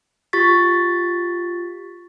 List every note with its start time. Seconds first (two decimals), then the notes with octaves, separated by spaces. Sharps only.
0.33 F4 G4 C#6 A6 B6